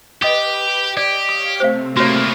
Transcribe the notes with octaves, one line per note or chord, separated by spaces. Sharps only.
G4 B4 D#5 D#6
G4 D5 D#5
C#5 F5 D#6
C3 A3 C4 C5 F5
A2 A#3 F#4 C#5